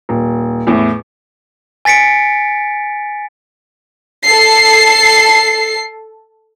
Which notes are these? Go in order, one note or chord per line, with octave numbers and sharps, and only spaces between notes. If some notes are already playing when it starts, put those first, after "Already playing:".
D#1
E2 A2
G#5 A6 B6 C#7 D7
A4 C7